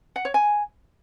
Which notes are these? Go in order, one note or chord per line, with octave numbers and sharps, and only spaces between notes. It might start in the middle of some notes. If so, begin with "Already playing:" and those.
F#5
C#5
G#5